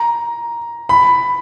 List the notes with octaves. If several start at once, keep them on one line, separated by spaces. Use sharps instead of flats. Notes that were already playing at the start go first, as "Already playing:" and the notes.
Already playing: A#5
B5